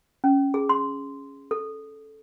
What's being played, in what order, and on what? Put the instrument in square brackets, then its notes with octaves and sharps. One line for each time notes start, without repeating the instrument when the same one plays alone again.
[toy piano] C#4
G#4
C6
A4